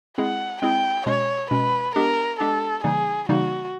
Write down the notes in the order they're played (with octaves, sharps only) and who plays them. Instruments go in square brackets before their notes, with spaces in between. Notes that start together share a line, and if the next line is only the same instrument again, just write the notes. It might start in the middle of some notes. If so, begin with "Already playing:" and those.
[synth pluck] G#3 C4 E4 G#4 [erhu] F#5
[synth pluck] G#3 C4 E4 G#4 [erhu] G5
[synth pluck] B2 G#3 C#4 [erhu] C#5
[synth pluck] B2 G#3 C#4 [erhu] B4
[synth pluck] G#3 B3 D4 G4 [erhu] A#4
[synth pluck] G#3 B3 D4 G4 [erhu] A4
[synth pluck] C#3 E3 G3 A#3 D#4 [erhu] G#4
[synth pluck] C#3 E3 G3 A#3 D#4 [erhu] F#4